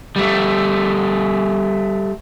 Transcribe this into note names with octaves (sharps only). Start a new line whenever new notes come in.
G3 A3